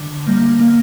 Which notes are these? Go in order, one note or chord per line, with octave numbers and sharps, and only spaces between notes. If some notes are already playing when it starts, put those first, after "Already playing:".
Already playing: D3
G3 A#3
A#3